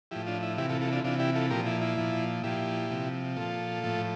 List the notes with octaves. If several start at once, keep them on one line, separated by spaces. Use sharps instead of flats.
A2 F3 E4 G4
D4 F4
E4
C3 E3 E4 G4
F4 A4
F4 A4
D4 F4
C3 E3 D4 F4
E4 G4
F4 A4
A#2 F3 G4 A#4
E4
E4
A#2 F3
A#2 F3 E4 G4
C3 F3
A#2 F3 F4 A4
A2 F3